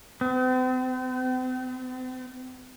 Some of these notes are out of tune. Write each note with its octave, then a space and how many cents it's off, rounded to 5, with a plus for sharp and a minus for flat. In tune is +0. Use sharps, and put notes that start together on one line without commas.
C4 -40